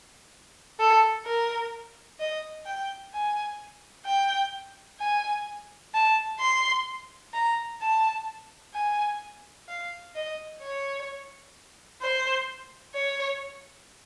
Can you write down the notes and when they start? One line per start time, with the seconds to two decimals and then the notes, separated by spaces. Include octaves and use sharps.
0.79 A4
1.25 A#4
2.20 D#5
2.66 G5
3.14 G#5
4.06 G5
5.00 G#5
5.94 A5
6.40 C6
7.34 A#5
7.81 A5
8.74 G#5
9.68 F5
10.15 D#5
10.61 C#5
12.02 C5
12.94 C#5